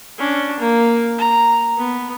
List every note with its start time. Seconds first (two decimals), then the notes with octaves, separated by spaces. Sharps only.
0.19 C#4 D4
0.59 A#3
1.18 A#5
1.77 B3